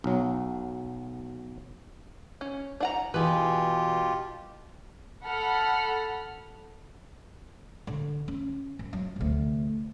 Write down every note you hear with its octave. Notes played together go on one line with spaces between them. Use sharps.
B1 F#3
C#4
D4 F#5 A#5
B2 E3 F4 G4 G#4 B4
A4 F#5 B5 F6
D3
C#4
F#2
F#3
D2 C3